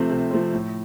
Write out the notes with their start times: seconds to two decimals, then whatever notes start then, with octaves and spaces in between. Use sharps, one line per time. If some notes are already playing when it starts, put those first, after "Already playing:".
Already playing: C3 F3 A3 C4
0.11 C3
0.31 F3 A3 C4
0.53 A2